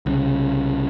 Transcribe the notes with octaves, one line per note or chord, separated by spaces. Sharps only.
C2 C#3